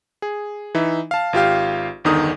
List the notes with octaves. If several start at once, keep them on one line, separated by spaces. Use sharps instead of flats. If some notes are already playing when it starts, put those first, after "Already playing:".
G#4
E3 D#4 E5
F5 A5
G#1 F4 G4 F5
G1 E2 D3 D#3 D#4 D#6